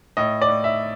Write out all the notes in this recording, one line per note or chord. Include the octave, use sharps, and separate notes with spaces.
A2 D#5
D5
A2
E5